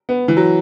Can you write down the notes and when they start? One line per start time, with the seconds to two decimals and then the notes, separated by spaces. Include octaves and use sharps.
0.09 B3
0.28 E3
0.37 F#3